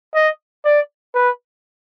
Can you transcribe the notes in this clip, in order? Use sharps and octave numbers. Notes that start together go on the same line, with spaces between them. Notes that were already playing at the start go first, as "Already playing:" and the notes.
D#5
D5
B4